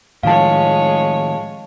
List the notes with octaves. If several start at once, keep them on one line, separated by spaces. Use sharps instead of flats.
A2 D#3 F3 G#3 C#5 F5 A5